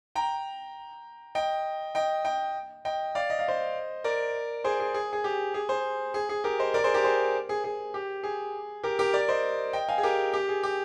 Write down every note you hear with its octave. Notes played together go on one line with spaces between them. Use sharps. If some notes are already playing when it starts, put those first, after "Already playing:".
G5 A#5
D#5 G5
D#5 G5
D#5 G5
D#5 G5
D5 F5
D#5
F5
C5 D#5
A#4 D5
G#4 C5
G#4
G#4
G#4
G4
G#4
G#4 C5
G#4
G#4
G4 A#4
C5 D#5
A#4 D5
G#4 C5
G4 A#4
G#4 C5
G#4
G#4
G4
G#4
G4 A#4
G4 A#4
A#4 D5
C5 D#5
D#5 G5
F5 G#5
G#4
G4 A#4
G4
G#4
G4